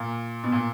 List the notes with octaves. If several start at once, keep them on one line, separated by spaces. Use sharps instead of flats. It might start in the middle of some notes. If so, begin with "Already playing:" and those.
Already playing: A#2
B2
A#2